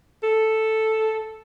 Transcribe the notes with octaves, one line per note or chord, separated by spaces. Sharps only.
A4